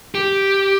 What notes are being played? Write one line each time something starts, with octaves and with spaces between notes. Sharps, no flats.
G4